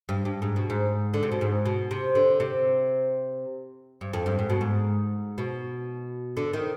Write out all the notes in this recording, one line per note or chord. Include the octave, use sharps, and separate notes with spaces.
G2
G2
G#2
B2
G#2
D3
C3
B2
G#2
B2
C3
D3
C3
G2
F2
G2
G#2
B2
G#2
B2
D3
D#3